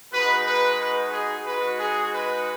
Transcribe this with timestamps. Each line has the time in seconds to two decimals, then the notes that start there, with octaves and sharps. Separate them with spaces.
0.12 G#3 D#4 F#4 B4
0.45 B4
0.78 B4
1.12 G#4
1.45 G#3 D#4 F#4 B4
1.78 G#4
2.11 B4